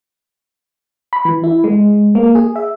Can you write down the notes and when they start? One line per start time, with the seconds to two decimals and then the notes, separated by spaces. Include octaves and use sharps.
1.13 B5
1.25 E3
1.44 E4
1.64 G#3
2.15 A#3
2.35 G#4
2.56 E5